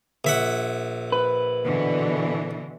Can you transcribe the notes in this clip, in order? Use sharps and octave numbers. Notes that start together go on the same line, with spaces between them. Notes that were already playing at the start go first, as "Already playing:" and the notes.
A#1 E5 F#5
B4
B2 D3 E3